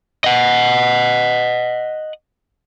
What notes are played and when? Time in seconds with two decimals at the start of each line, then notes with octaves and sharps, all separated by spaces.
0.24 D#5 F#5